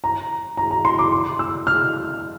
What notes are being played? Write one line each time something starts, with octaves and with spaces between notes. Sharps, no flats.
A#5
A#5
A#5
C6
D6
C6
E6
F6